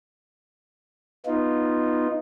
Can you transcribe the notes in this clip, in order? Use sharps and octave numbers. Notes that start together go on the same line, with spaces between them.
B3 D#4 F4